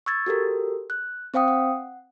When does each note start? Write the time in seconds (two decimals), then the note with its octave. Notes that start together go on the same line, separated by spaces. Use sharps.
0.06 C#6 E6 G#6 A6
0.26 F#4 G4 A4 A#4
0.90 F#6
1.34 C4 C5 F5 G5 D#6
1.48 F#5